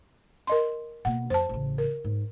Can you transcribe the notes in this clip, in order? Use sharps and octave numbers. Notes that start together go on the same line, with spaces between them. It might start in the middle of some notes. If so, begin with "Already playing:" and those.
A#4 D#5 C6
B2 A#3 F#5
F2 C5 A5
A1 C#3
A#4
G#2